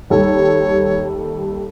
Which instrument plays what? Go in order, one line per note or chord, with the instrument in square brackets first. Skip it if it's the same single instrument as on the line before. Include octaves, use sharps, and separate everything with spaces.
[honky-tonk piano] D#2 G3 A4 [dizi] C#5